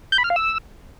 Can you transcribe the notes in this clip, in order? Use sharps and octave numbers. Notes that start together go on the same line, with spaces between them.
G6
B5
F6
F5
E6